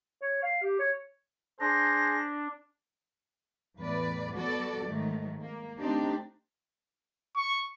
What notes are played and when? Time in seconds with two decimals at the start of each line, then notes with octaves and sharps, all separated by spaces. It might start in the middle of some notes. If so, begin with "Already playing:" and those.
0.22 C#5
0.42 F5
0.62 G4
0.79 C#5
1.60 D4 G#4 C5 A#6
3.78 E2 A2 B4 D5
4.37 F#3 B3 F#4 A4 D5
4.85 G#2 D#3 F#3 A3
5.42 A#3
5.80 A3 C4 D4 D#4 G4
7.37 C#6